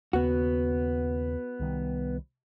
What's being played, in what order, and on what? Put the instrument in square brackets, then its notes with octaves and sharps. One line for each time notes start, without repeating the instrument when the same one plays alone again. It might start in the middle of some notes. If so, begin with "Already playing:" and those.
[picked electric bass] D#2 C#3 [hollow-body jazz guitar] B3 F#4
[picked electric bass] C2 D#3 G3